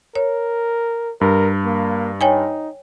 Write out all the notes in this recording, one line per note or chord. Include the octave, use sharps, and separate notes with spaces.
A#4 C#5
G2 A#4
A#3
D#4 C#5 G5 G#5